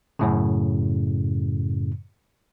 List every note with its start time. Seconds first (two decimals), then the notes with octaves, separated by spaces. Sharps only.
0.19 F#2 A2 C#3